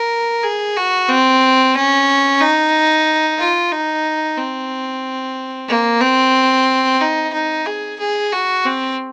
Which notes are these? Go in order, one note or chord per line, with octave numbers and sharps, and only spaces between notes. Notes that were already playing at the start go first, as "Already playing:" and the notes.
Already playing: A#4
G#4
F#4
C4
C#4
D#4
F4
D#4
C4
A#3
C4
D#4
D#4
G#4
G#4
F#4
C4